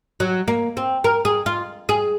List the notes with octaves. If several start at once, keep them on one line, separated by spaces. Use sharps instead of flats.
F#3
A#3
C4
A#4
G#4
F4
G#4